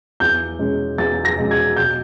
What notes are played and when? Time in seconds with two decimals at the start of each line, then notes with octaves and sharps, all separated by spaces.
0.20 E2 G6
0.59 B2 G#3 C#4
0.98 E2 A6
1.25 A#6
1.38 B2 G#3 C#4
1.51 G#6
1.76 B2 G6